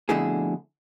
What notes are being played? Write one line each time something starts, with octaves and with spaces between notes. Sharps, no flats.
F2 B2 D3 A3 E4 G#4